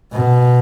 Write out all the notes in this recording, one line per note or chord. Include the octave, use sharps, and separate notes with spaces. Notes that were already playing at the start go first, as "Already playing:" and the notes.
B2